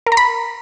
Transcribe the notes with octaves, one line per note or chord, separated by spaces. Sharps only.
A#4
A#5
B5